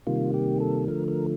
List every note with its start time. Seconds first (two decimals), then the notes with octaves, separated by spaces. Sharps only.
0.07 C3 D#3 G3 A#3 F4
0.34 G4
0.60 A4
0.88 D3 F3 A3 A#4
1.08 A#4